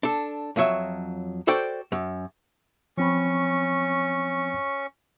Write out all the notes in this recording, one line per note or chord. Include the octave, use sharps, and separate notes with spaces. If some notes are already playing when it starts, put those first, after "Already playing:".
D4 A4
F2 F3 F#3 C#5 E5
F#4 A4 C5 D5 G5
F#2
F3 C4 C#4 B5 C#6